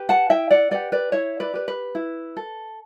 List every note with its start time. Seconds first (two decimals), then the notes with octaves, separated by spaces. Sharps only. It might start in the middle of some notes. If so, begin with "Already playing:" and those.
Already playing: G4 B4
0.09 F#5 A5
0.30 E4 E5 G5
0.50 D5 F#5
0.71 G4 B4 D5 F#5
0.92 B4 D5
1.12 E4 C#5 E5
1.40 B4 D5
1.54 G4 B4
1.68 B4
1.95 E4
2.37 A4